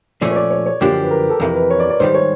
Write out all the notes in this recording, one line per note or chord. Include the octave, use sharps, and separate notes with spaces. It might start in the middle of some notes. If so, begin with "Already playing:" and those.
A#2 F3 A3 C#4 D5
C#5
D5
C#5
C#5
F#2 D3 F3 A#3 D4 G4
B4
A#4
A4
F2 C3 E3 A#4
B4
C#5
D5
D5
G#2 D#3 G3 C5
C#5